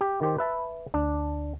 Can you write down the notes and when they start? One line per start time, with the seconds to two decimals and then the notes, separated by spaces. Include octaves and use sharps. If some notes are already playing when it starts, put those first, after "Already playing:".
0.01 G4
0.21 D#3 G4 C5
0.38 B4 E5 A5
0.94 D2 D4